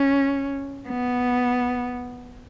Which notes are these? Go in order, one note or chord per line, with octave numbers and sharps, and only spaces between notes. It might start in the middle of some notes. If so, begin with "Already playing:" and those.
Already playing: C#4
B3